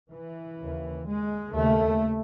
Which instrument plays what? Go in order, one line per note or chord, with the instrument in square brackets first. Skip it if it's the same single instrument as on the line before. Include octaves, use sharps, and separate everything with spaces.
[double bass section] E3
D#2 C#3
G#3
D#2 C#3 A3